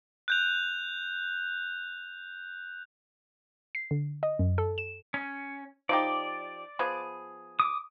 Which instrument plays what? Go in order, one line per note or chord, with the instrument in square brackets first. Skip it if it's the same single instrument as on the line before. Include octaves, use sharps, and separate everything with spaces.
[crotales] F#6 G6 F7
[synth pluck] C7
D3
D#5
F#2
A4
E7
[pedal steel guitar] C#4
[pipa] F3 D#4 G4 [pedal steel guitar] D5
[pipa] F3 B3 G#4
[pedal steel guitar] D6 D#6